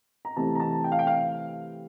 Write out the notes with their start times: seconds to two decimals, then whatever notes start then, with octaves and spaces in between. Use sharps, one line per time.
0.25 A#5
0.37 C3 E3 A3 C4 A5
0.55 A#5
0.60 A5
0.84 G5
0.92 F5
0.99 G5
1.07 F5